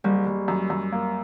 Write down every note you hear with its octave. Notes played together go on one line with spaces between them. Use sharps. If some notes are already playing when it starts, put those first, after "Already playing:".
F#1 G3
F#1
F#2
F#2
A#3